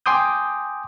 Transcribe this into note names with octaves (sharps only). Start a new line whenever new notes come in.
G5 G#5 C6 D6 D#6 G6